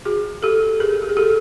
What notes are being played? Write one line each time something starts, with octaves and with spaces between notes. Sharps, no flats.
F#4 G#4
G4 A4
G#4 A#4
G4
G#4
G4 A4